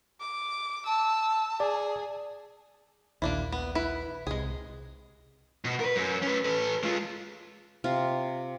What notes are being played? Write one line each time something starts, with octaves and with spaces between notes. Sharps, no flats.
D6
A5 E6
G#4 D5
A#1 D#2 A#3 D4 E4
B3
E4 B4
C2 C3 G#3 G#4
B2
A#4 B4
F#2
C#4 B4
A4 B4
G#3 F4
C3 F4